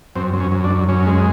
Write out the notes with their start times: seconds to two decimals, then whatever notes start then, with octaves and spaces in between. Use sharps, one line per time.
0.15 F#2 C4
0.33 F#2
0.40 C#4
0.51 F#2
0.64 D4
0.70 F#2
0.88 F#2 C#4
1.07 G#3